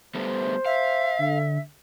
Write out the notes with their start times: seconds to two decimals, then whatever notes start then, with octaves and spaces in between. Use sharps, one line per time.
0.15 G3 A3 B3 C5
0.66 E5 F5
1.19 D3